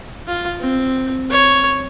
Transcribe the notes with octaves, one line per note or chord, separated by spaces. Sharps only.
F4
C4
C#5